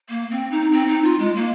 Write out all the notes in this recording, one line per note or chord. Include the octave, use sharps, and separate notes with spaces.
A#3
C4
D#4
C4
D#4
F4
G#3
A#3